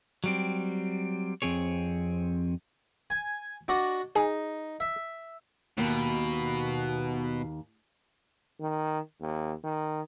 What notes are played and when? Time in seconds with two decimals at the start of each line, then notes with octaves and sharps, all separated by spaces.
0.24 F#3 G3 C4
1.42 F2 C4 G#4 C#5
3.10 G#5
3.68 D4 F#4 D#5
4.15 D#4 G#4
4.80 E5
5.78 D#2 B2
8.60 D#3
9.20 D#2
9.64 D#3